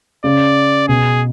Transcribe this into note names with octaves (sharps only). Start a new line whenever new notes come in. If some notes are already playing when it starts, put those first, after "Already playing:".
C#3 D5
B2 G#4